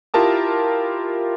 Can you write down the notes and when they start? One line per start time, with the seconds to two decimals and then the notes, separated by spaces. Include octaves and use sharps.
0.14 E4 F4 G4 A#4 A5 D#6